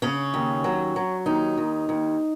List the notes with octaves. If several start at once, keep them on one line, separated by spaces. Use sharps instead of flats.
C#3 C#4
D#2
F#3
F#3
D#2 D#4
D#2
D#2